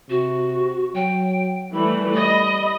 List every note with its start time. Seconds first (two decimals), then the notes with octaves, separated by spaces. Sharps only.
0.10 C3 F#4
0.95 F#3 G5
1.74 E3 G3 A3 B5
2.17 D#5